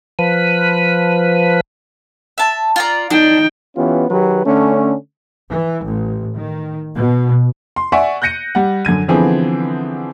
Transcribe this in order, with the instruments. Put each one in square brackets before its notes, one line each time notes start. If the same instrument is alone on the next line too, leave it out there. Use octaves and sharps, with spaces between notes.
[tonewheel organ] F3 B4
[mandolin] E5 A5
F4 D5 A#5
[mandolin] D4 [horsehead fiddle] D#4 G5
[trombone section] E3 B3 C#4 F4 G4
D#3 F#3 G4 B4
D3 A3 C#4
[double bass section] E3
A1
D#3
B2
[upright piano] C6
D5 E5 F#5 G#5 C#6
F#6 G6 A#6 C#7 D#7
G3 F#5
F#2 D3 G#6 D#7
D3 E3 F3 B3 C4 G#4